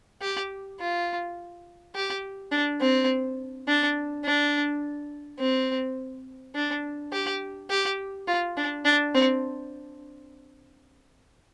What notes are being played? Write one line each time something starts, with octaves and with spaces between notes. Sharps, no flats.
G4
F4
G4
D4
C4
D4
D4
C4
D4
G4
G4
F4
D4
D4
C4